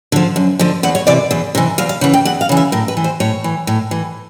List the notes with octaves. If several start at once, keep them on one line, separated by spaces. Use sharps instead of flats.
D3 F3
F#2
D3 F3
E2 F#5
C#5
C3 E3 D5
E2
C3 E3
E2 F5
F5
C#3 E3 F#5
G5
E2 F#5
F5
C#3 E3
E5
A2 A#4
B4
E3
C5
A2 C#5
E3
A2
E3